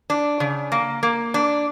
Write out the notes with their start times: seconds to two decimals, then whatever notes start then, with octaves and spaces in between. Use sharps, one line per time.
0.10 D4
0.40 C#3
0.72 A#3
1.03 A#3
1.34 D4